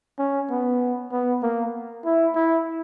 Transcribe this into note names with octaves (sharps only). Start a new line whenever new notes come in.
C#4
B3
B3
A#3
E4
E4